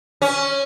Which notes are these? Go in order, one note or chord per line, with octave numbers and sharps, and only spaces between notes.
C#4